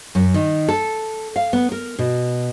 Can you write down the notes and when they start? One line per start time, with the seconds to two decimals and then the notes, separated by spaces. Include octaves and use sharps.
0.15 F#2
0.34 D#3
0.68 A4
1.36 F5
1.53 B3
1.72 A#4
1.99 B2